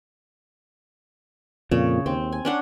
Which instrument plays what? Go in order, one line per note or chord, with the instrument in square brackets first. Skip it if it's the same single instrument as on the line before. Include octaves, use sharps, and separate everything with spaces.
[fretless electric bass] F2 A#2 [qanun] C#3 C#5
[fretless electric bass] D#2 [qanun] C4
[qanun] G#5
C#4 D4 F#5